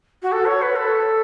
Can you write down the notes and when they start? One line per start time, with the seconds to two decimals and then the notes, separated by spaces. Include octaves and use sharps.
0.22 F#4
0.32 A4
0.46 C#5
0.62 B4
0.76 A4